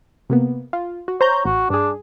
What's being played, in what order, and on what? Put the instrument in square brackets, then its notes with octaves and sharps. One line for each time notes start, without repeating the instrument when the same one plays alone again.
[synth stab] C3 A#3 B3
F4
F#4
[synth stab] C5 A#5 G6 [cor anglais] C#5
[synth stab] A1 [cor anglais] F#4
[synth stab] G2 G#4 [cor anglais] D4